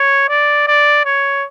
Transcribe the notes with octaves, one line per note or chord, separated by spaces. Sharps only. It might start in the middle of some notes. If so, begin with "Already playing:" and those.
Already playing: C#5
D5
D5
C#5